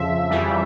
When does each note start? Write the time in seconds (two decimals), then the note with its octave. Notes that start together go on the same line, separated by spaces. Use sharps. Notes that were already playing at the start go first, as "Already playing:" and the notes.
Already playing: F2 C#3 F3 E5
0.30 F2 C#3 E3 G3